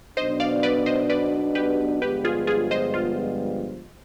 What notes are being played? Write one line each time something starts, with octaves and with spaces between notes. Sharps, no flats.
B1 B2 B3 D4 C5 D#5
D5 F5
B4 D5
C5 D#5
B4 D5
G4 B4
G1 G2 F3 G#3 B3 G4 B4
F4 G#4
F4 G#4
C5 D#5
F4